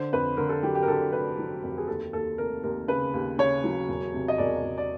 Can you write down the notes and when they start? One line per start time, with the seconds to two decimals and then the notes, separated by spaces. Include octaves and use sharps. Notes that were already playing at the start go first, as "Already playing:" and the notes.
Already playing: D3 C5
0.13 F2 B4
0.37 D3 A#4
0.49 A4
0.63 F#3 G4
0.75 G4
0.83 A#4
0.87 D3 A4
1.12 F1 B4
1.38 F#3
1.63 F2 G4
1.78 G#4
1.88 D#2 A4
2.13 D#2 A4
2.38 F1 A#4
2.63 D#2 A#4
2.88 C#3 B4
3.14 D#2
3.38 C#3 C#5
3.64 F#3
3.88 E1
4.14 C3
4.28 D#5
4.38 E1 D5
4.64 E1
4.78 D5